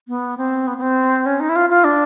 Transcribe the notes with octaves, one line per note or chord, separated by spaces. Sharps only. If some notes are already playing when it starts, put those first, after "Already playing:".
B3
C4
B3
B3
C4
C#4
D#4
E4
F4
F4
D4